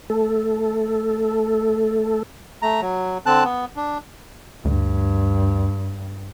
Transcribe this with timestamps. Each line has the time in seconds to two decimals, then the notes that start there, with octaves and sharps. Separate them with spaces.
0.10 A3 A4
2.62 A3 A#5
2.81 F#3
3.26 D3 C4 A5 F#6
3.44 B3
3.76 D4
4.65 D2 G2